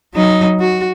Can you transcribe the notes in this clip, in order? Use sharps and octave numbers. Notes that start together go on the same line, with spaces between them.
F#3 D#4
F#4